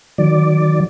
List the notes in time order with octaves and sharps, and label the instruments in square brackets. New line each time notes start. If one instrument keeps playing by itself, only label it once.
[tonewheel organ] D#3 F#3 D5